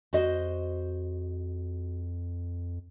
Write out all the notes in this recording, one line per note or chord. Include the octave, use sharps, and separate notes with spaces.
F2 F#4 C5 D#5